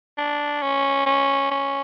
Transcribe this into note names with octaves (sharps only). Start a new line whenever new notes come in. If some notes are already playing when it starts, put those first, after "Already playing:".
D4
C#4
C#4
C#4